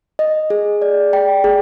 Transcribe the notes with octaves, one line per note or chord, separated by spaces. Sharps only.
D#5
G#4
D5
G5
G#4